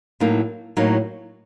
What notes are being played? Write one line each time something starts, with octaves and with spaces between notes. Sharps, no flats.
A2 F#3 A#3 D#4
A2 F#3 A#3 D#4